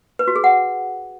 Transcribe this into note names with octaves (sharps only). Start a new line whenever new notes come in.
B4
F#4
G#4
F#5